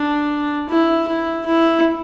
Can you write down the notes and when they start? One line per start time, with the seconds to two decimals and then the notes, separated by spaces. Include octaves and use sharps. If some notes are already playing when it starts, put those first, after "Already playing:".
Already playing: D4
0.69 E4
1.08 E4
1.46 E4